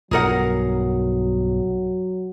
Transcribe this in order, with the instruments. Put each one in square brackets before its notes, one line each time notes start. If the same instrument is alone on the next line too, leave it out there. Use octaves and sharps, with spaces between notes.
[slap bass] B1 G2 [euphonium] F#3 [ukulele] G#4 A#4 F#5